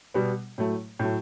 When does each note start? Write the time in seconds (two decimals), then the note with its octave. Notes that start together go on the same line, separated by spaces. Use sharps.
0.14 B2 G3 B3
0.58 A2 F#3 A3
0.99 A2 F#3 A3